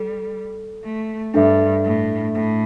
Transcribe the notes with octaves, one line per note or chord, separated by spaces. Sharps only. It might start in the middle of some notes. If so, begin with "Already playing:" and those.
Already playing: G3 A4
A3
G2 D4 A4 E5
A2
A2